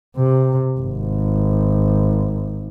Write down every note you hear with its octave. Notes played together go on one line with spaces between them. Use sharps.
C3
G#1